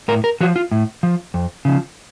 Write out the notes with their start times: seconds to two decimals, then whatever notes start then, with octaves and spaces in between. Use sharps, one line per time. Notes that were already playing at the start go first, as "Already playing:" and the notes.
0.08 A2 A#4
0.24 A#4
0.41 F3 F#4
0.56 F4
0.72 A2
1.03 F3
1.34 F2
1.65 C#3 F3